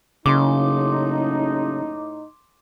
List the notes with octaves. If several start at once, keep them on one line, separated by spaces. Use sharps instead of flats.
F#1 A2 C#3 D#4 C6 D6